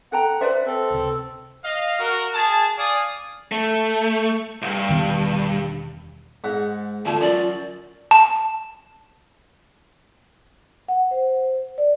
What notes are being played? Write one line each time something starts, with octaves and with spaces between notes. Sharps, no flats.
A4 F#5 G5 A#5
B4 C5 D5 E5
C4 A4
C#2 C3
D#5 F5
F#4 A#4
G#4 A5
D5 F5 G#5 D#6
A3
C2 G2
E1 D#3 B3
G#2 F#5
D2 F4 G#5 A5
F#2 D5
A5
F#5
C5
D5